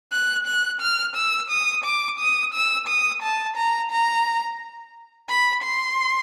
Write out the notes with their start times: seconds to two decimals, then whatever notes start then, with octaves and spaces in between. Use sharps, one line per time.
0.12 F#6
0.47 F#6
0.81 F6
1.16 E6
1.50 D#6
1.85 D6
2.19 D#6
2.54 E6
2.88 D#6
3.23 A5
3.57 A#5
3.91 A#5
5.29 B5
5.63 C6